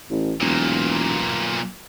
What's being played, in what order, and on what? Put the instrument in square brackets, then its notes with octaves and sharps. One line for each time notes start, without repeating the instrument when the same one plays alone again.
[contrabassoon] A1
[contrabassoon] E1 [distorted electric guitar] B1 A#2